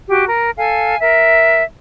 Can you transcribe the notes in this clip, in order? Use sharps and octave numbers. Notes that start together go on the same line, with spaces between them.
F#4 G4
A#4
A4 F5 G#5
A#4 E5